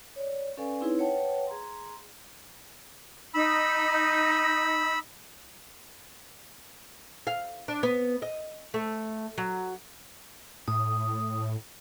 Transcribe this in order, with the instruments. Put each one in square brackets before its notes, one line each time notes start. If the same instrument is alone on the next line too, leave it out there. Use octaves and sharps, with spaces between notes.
[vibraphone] C#5 D5
C#4 A4 B4 D5 F5 G#5
C4 D#4 E4 G#4 B4 C#5
B4 C#5 F#5 G5 A5
G#4 A#5 C6
[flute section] D#4 [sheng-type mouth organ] B5 E6
[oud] F5
D4
B3
D#5
A3
F#3
[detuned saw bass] A2 [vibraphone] D#6